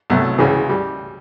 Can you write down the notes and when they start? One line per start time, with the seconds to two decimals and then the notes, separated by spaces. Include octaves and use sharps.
0.10 C2 B2 F#3 A3
0.39 C#2 C#3 E3
0.69 G3